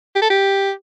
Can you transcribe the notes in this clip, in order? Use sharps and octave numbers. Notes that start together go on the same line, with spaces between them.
G4
A4
G4